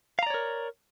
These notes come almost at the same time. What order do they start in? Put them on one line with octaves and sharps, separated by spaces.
F5 A#5 D5 C#5 A#4